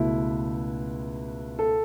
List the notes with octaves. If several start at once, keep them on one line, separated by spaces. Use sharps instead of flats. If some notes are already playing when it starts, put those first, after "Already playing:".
Already playing: C#2 B2 A3 E4
A4